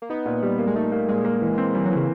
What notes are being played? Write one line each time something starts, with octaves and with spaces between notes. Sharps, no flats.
A#3
B3 D#4
A#2
G3
A#3
G#3
A3 D#4
A#3
A#2 G#3
A#3
E3
C4
E3 G3
F#3
E3
C#3